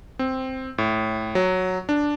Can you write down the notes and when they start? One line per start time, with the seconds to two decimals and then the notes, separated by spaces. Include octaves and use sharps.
0.19 C4
0.78 A2
1.35 F#3
1.89 D4